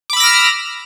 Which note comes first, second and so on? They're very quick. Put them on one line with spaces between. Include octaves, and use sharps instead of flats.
D6 B5 E6 A#6 F6